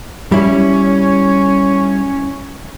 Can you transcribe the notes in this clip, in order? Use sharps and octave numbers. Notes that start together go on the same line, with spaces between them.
G3 C#4 E4